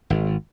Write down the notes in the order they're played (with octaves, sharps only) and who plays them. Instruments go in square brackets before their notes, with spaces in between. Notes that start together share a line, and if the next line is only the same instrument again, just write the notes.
[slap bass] G#1